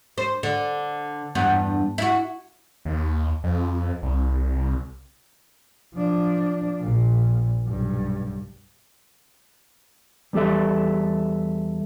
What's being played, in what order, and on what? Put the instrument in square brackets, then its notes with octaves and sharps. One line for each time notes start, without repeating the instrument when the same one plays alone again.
[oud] C5
D3
E2 G2 B3
E4 F#4
[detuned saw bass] D#2
F2
C2
[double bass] F3 D4
A#1 A#2
B1 G2
[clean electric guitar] E2 G3 G4 A4 E5